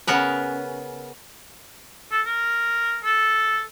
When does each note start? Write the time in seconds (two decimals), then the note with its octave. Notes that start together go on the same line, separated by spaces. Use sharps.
0.07 C#3 B3 A#4 B4
2.11 A4
2.26 A#4
3.04 A4